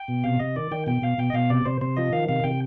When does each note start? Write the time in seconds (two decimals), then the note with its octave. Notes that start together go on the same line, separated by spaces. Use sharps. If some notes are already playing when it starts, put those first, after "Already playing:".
Already playing: G5
0.08 B2
0.24 C3 F5
0.39 C3 D#5
0.56 D#3 D5
0.71 D#3 G5
0.87 B2 G5
1.02 B2 F5
1.18 B2 G5
1.30 D#5
1.34 B2 F5
1.50 C3 D5
1.65 C3 C5
1.81 C3 C5
1.97 F3 D#5
2.13 D#3 F5
2.28 C3 F5
2.44 C3 G5